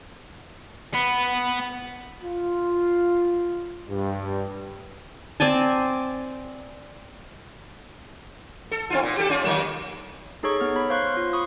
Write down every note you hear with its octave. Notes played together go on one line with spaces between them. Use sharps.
B3
F4
G2
C4 D5 G#5 A5
A4
C4 E4 F4
A#2
G4 A4
C#4 F4
D#3 F#3 A#3
D#4 G#4 A4 C#5 C#6
B3 F6
C#5 B5
C5 C#5 F5 C6 C#6 F#6
F4 C6
B5 C#6 D#6